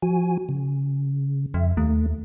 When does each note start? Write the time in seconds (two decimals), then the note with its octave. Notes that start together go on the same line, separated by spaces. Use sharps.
0.02 F3 F#4 G#5
0.49 C#3
1.54 F2 E5
1.77 D#2 A3